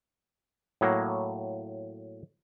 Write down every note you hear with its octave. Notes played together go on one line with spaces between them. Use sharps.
A2 F#3 A#3